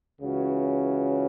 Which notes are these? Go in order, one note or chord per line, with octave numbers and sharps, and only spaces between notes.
C#2 C#3 E3 C#4 F#4